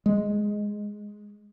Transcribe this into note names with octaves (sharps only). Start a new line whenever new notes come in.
G#3